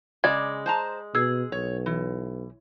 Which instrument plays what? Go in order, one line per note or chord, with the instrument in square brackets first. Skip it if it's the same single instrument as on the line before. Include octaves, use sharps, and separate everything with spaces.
[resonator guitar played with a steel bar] C#3 [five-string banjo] G#3 D5 [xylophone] G#6
[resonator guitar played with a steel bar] C5 A5 A#5
[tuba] B2 [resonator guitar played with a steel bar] G#4 [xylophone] E6 G#6
[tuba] B1 [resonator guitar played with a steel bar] C#5
[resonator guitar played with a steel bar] E3